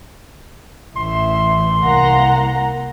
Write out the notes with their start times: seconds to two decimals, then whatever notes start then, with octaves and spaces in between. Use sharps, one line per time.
0.96 A1 E5 C6
1.84 C2 A#3 F#5 A#5